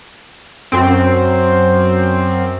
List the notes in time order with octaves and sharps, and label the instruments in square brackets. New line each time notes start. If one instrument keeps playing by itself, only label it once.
[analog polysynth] F#2 C4